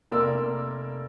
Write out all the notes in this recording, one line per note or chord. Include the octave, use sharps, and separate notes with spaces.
F1 A#3 A#4 D5 C6 E6